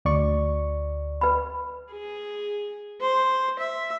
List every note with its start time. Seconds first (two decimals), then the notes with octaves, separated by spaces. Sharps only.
0.05 D2 D5 C#6
1.21 B4 B5
1.91 G#4
3.01 C5
3.59 E5